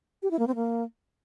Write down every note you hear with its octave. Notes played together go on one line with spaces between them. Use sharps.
G4
E4
A#3
C4
A#3